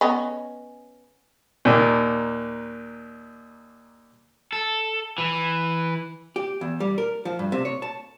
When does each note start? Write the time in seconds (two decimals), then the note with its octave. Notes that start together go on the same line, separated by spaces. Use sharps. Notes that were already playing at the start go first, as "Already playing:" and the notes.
0.01 B3 C#4 D#5
1.65 D#2 A#2
4.53 A4
5.18 E3
6.36 G4
6.61 E2
6.80 G3
6.98 A#4
7.25 F3
7.39 G2
7.52 C3
7.65 C#5
7.82 A5